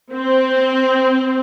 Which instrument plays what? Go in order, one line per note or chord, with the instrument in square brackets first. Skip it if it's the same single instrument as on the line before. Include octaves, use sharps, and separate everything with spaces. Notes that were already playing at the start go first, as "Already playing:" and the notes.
[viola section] C4